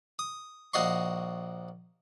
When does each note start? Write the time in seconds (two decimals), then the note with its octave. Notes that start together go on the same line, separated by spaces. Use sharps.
0.19 D#6
0.73 A#1 F#4 D#5 C6 C#6